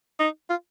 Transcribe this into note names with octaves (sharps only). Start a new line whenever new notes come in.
D#4
F4